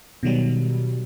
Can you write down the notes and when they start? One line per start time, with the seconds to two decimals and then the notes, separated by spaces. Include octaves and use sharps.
0.23 B2 D#3 F#3 G3